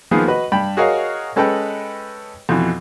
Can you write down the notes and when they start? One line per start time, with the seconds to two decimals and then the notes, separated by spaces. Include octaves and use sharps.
0.11 D#3 F3 A#3 B3 G#4 C5
0.27 F#4 B4 D#5
0.52 G2 G5 B5
0.77 F#4 G#4 A#4 C#5 D#5 F5
1.36 G#3 C#4 A4 B4 D#5 G5
2.49 F2 B2 E3